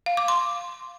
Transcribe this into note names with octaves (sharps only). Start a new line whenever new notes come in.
F5
D6
C6